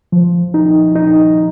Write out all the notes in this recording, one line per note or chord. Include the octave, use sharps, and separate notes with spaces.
F3
D#4
D#4